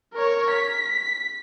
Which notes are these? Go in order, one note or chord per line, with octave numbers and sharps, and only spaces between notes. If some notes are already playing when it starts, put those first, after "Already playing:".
A#4 C#5
B6